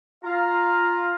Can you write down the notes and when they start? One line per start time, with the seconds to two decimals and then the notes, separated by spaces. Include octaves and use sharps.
0.24 F4 F5 A#5